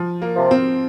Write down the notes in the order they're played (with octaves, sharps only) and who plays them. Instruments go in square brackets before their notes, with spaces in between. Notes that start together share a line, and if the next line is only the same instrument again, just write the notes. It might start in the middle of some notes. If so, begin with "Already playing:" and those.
Already playing: [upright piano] F3
A#3
[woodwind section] C3 F3
[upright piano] C4